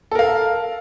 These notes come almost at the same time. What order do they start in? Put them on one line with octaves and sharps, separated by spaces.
A4 A#4 F5